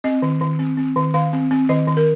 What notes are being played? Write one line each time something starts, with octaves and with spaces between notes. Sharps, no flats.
C4 D#5
D#3
D#3
C4
C4
D#3
D#3 F5
C4
C4
D#3 D#5
D#3
A#4